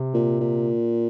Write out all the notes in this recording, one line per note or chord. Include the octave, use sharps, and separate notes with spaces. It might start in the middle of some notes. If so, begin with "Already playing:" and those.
Already playing: C3
A#2
A#2